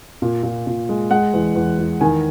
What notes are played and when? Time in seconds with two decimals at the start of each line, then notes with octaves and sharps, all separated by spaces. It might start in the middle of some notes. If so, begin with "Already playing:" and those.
0.22 A#2
0.43 A#2
0.67 A#2
0.89 G#3
1.11 G#3 F#5
1.34 E2
1.55 E2
1.78 E2
2.01 D#3 G#5